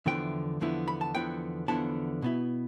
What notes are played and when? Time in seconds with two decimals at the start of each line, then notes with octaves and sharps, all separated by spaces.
0.06 E2 D3 F3 B3 E4 G5
0.61 E2 D3 F3 B3 E4
0.88 B5
1.01 A5
1.15 E2 D3 F3 B3 E4 G5
1.68 E2 D3 F3 B3 E4 A5
2.22 B2 B3 E4